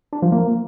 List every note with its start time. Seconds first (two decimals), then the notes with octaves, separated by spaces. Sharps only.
0.13 D4
0.22 F3
0.32 A#3